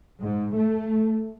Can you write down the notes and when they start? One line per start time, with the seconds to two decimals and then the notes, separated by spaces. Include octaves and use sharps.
0.23 G#2
0.57 A3